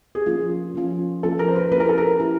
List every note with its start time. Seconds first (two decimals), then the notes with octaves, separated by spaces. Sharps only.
0.15 G#4
0.26 F3 A#3 C#4 F4
0.75 F3 A#3 C#4 F4
1.23 F3 A#3 C#4 F4 A4
1.39 A#4
1.48 C5
1.56 B4
1.72 A#3 C#4 E4 G4 B4
1.80 A#4
1.89 A4
1.98 A#4
2.19 A#3 C#4 E4 G4